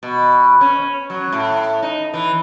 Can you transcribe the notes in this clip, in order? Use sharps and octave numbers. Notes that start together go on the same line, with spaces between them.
B2
C#4
F#3
A2
D#4
E3